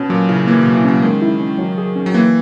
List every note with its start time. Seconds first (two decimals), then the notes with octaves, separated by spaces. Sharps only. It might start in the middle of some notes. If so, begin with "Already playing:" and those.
Already playing: B2 C#4
0.10 A#2 F#3
0.29 C#3 E4
0.47 E3 A#3
0.61 B2 F#3
0.75 E3
0.84 F#3 C#4
1.03 D#3 G#3
1.22 E4
1.40 C#4
1.58 F#3
1.78 G#4
1.96 C#4
2.06 F#3
2.14 E3 A#3